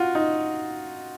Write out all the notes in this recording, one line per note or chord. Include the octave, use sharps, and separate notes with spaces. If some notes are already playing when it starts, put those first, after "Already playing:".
Already playing: F4 F#4
D#4